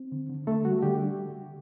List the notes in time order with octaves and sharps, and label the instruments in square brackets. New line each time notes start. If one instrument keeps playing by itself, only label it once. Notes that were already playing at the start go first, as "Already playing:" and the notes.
Already playing: [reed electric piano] C4
D3
D3
D3 A3 A4
G3 F#4
D3 G4